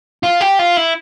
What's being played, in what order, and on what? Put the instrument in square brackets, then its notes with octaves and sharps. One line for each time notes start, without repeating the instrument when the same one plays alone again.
[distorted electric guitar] F4
G4
F4
E4